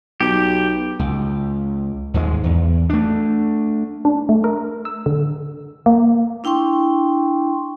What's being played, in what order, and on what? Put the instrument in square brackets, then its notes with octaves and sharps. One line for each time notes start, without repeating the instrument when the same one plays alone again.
[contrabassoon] B1 [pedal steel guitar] G4
[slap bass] C#2
D#2 G#2 G3 G#3
E2
A3 D4
[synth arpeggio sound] D4
A3
A#4
E6
D3
A#3
[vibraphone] D4 E4 G5 C6 C#6